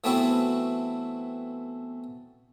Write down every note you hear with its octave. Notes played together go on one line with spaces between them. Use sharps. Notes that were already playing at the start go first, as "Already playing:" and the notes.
E3 A3 B3 C4 E4 F#4